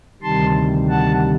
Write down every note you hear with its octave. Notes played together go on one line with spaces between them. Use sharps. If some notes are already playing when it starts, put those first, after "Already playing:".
D2 C3 D#3 G3 A5 C6
F#5 A5